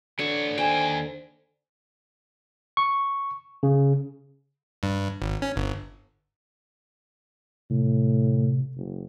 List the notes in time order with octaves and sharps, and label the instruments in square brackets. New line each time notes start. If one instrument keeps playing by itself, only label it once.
[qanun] D3 [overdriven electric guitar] E3 C#5
[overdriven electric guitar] D#2 G5 [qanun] C5 [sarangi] G#5
[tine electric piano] C#6
C#3
[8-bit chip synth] G2
G#1
C#4
G1
[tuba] A2 [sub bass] C3
[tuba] F#1